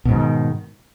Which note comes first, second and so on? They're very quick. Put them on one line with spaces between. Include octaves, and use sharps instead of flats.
B2 G#2 D3 D#3